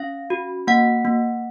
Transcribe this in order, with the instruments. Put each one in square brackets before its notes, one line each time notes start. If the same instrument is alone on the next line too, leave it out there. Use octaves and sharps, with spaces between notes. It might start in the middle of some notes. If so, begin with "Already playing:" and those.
Already playing: [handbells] C#4 F5
F#4
A#3 F#5
A#3